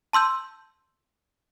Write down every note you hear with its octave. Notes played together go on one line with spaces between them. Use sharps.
A5 C6 E6 G6